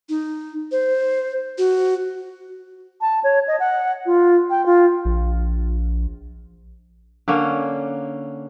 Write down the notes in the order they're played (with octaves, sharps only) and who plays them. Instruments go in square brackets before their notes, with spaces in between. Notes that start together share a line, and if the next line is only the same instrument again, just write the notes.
[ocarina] D#4
C5
F#4
[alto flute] A5
C#5
D#5
F#5
F4
G5
F4
[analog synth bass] A#1
[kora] D3 A#3 C#4